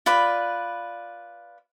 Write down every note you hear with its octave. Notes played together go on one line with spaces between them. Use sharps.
F4 B4 D5 B5